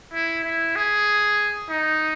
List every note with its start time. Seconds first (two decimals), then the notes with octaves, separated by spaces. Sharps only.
0.13 E4
0.44 E4
0.76 G#4
1.69 D#4